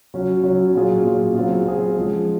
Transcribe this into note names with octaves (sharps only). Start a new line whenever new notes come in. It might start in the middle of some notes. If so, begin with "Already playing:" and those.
F#3 C#4 F#4
F#3 C#4 F#4
A#2 F#3 C#4 F4 G#4
A#2 F#3 C#4 F4 G#4
F#3 C4 F4 G#4
F#3 C4 F4 G#4
F3 G#3 C#4